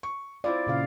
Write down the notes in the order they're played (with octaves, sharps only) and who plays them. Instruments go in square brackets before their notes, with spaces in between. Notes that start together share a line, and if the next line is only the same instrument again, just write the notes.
[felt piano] C#6
[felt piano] C4 E4 F4 [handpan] D5
[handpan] A#2 C#3 F5